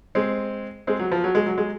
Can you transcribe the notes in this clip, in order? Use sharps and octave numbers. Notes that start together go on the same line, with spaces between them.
G#3 C4
G#3 C4
F#3
F3
F#3
G#3
F#3
G#3